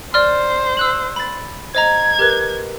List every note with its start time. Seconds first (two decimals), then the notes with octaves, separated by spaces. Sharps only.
0.14 C5 D5 C6 F6
0.77 E6 F#6 F#7
1.16 B5 A6
1.75 C5 D#5 A#5 G#6
2.19 G4 A#4 B4